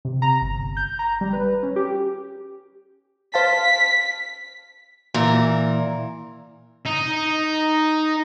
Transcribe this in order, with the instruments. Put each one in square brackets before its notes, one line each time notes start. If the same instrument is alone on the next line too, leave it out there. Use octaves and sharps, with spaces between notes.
[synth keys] C3
A#5
G1
G6
A#5
G3
B4
C#4
G4
[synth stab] C5 F5 A5 [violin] B6
[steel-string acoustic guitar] A#2 E3 A#4
[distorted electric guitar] D#4